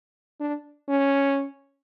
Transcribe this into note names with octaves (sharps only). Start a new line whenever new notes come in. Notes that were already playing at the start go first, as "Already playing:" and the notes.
D4
C#4